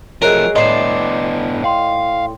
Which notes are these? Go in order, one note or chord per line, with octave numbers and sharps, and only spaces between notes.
F3 F#3 G#3 A3 A#4 F#6 D7 F7
A2 B3 D4 D#4 D5 C6 C7 E7
F5 G5 C6